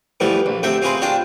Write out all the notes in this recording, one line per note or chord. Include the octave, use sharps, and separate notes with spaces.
B2 E3 F3 G3 A3 B3
A#1
C3 A3 C4 E5 F#5 G5
C4 F4 F#4 G#4 B4 C5
D4 F4 F#4 D5 G5 A5